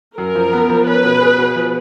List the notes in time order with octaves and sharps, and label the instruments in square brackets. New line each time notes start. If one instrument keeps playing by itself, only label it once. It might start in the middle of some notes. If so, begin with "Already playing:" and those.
[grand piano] F#2 [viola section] A#4
[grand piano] F3
B3
F3
[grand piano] C#4 [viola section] B4
[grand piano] B2
G#4
B2
F3